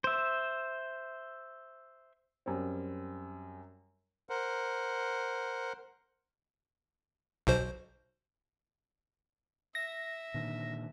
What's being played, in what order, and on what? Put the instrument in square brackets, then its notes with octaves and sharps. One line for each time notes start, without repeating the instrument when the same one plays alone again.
[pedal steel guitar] C5 E5
[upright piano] F#2 G3 C4
[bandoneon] A#4 C5 F#5
[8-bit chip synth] B1 B2 C5
[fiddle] E5 [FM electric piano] A#6
[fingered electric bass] A#2 D3 D#3